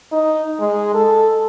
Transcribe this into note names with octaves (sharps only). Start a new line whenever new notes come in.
D#4
G#3
A4